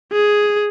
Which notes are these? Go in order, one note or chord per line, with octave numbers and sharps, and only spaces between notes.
G#4